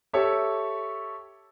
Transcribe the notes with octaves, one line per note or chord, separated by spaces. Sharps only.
G4 A4 C#5 E5